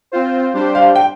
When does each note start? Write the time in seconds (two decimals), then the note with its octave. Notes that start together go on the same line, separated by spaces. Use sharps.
0.12 C4 F4 C5
0.54 G3 D4 G4 C5
0.75 F5
0.96 G5